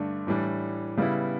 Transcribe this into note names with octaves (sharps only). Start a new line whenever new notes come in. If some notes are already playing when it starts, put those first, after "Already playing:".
Already playing: G2 D3 A3 D4
A2 E3 G3 D4
C#3 G3 B3 E4